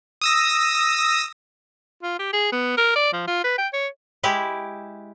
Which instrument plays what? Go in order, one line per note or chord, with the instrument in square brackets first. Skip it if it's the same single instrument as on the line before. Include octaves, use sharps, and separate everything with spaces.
[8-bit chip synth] D#6 E6 A#6
[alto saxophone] F4
G4
G#4
B3
A#4
D5
F3
F4
B4
G5
C#5
[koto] G#3 E4 G4